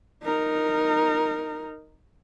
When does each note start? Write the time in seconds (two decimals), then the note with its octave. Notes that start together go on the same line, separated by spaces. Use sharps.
0.23 D#4 A#4